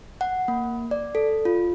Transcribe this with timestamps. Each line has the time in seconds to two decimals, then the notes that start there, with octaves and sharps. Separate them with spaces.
0.21 F#5
0.48 A#3
0.91 D5
1.15 A4
1.45 F4